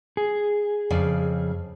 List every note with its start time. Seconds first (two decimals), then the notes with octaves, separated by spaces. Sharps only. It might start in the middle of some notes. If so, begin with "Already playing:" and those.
0.17 G#4
0.90 F2 C#3 D5